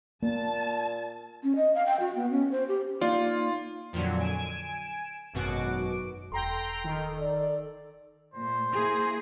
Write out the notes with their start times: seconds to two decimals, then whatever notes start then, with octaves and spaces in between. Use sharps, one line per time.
0.22 A#2 A#3 A5
1.43 C#4
1.56 D#5
1.75 F5
1.86 G5
2.00 F#4
2.16 B3
2.31 C#4
2.52 C5
2.68 G4
3.01 A#3 D#4 F4 D5
3.93 F2 A#2 D3 F#3
4.20 G#5 D7 E7
5.33 G#1 F#2 B2 F#4 D6 D7
6.32 E1 A4 G5 A#5 C6
6.84 D#3
7.19 D5
8.34 A#2 A3 C5
8.73 A#3 E4 G#4